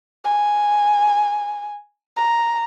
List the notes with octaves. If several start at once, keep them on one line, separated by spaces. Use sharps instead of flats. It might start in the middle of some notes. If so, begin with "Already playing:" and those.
G#5
A#5